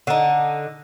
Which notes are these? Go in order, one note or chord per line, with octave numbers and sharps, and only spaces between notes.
D3 D#4